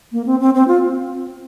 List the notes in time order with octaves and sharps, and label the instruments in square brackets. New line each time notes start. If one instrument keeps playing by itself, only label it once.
[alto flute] A#3
C4
C4
C4
F4